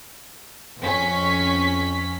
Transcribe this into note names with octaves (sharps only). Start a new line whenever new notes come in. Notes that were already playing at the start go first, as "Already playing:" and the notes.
F2 C#4 B6